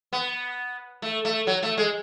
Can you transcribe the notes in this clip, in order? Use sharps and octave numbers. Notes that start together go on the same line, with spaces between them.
B3
A3
A3
F#3
A3
G#3